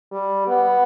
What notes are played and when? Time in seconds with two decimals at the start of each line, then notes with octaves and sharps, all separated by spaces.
0.12 G3
0.48 B3